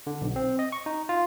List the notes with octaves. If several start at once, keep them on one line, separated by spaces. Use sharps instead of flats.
D3
B1
C4
D#5
C#6
D#4
F4